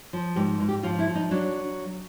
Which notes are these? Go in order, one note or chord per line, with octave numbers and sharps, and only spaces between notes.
F3
G#2 G4
G#2
G4
F3 F4
E4
F3
D#4
F#3 D4